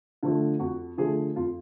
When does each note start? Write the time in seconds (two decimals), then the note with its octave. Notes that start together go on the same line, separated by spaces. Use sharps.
0.23 D3 F3 A3
0.59 F2 F#4
0.97 D3 F3 A3 G#4
1.36 F2 F4